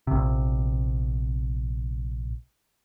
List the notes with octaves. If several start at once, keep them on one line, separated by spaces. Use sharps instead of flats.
A#1 C3